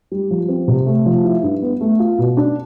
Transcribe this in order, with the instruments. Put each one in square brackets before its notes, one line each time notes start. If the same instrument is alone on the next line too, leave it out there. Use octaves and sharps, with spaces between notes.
[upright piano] G3
F3
C4
C3
A3
F3
E4
G2
B3
A3
F4
B2
D4